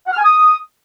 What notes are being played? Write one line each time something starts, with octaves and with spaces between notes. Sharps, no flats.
F#5
F6
G#5
D#6